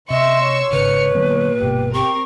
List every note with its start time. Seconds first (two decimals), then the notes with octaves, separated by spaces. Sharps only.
0.10 C3 D#5 E5 C6 C#6 E6
0.42 C#5
0.73 G#1 C#3 B4 F6 C#7
1.15 A#2 D3 F#3 B3
1.60 G1 B2 G4
1.93 C4 G4 A#4 C#6